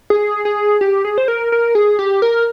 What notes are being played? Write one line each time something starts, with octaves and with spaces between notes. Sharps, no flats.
G#4
G#4
G4
G#4
C5
A#4
A#4
G#4
G4
A#4